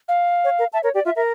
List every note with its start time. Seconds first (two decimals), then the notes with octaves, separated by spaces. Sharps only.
0.08 F5
0.44 C#5
0.59 A#4
0.73 E5 A5
0.83 A#4 C#5
0.94 G4 D5
1.05 F4 E5
1.16 A#4 E5